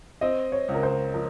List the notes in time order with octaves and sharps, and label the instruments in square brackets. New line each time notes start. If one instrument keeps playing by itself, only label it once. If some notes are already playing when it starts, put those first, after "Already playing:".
[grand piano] C4 [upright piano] D#5
[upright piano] C#5
[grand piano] C#2
[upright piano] A#4
C5
[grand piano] F3 [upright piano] A#4